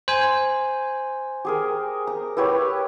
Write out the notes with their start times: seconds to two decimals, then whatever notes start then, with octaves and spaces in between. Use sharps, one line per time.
0.08 C5 G#5
1.45 G4 G#4 A#4
2.07 A#5
2.37 E4 G4 B4 C#5